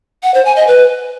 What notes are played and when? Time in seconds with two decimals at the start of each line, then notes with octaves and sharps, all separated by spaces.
0.23 F#5
0.34 C5
0.45 G#5
0.56 D#5
0.67 B4